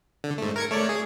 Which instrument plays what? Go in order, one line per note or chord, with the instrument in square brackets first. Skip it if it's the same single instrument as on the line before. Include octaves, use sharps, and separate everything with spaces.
[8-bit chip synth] D3
G#2 A3
A#4 G#6 C#7
A3 C#5 D5
G#4